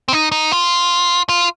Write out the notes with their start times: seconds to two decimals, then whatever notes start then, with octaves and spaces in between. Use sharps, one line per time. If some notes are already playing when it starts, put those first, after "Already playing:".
0.08 C4
0.13 D#4
0.32 D#4
0.52 F4
1.29 F4